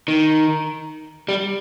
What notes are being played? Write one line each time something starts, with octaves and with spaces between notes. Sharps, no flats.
D#3
G3